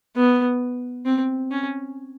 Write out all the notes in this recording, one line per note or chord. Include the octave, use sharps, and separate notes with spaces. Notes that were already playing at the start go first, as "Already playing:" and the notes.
B3
C4
C#4